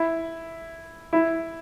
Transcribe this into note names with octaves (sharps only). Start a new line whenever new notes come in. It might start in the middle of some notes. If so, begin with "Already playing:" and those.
Already playing: E4
E4